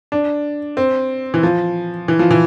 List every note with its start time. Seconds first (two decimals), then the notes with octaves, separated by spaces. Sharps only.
0.12 D4
0.77 C4
1.34 E3
1.43 F3
2.08 E3
2.19 F3
2.31 E3